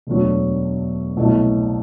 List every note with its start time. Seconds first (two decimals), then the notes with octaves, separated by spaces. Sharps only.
0.07 E1 D2 D3 F#3
1.17 C2 B2 F#3 A3